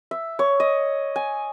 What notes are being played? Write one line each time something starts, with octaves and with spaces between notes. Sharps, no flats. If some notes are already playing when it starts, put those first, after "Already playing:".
E5
C#5
D#5
G#5